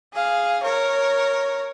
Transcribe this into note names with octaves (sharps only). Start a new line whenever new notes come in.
G#4 F5
A#4 C#5